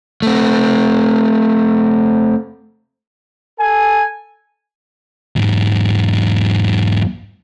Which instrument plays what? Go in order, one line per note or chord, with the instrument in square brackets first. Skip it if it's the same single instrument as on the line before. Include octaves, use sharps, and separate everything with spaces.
[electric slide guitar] A3 C4
[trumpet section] A4 G#5
[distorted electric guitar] E2 G#2